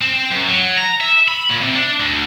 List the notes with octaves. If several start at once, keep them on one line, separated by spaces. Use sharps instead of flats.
C4
F#2
F#3
A#5
E5
B5
A#2
C3
D4
D2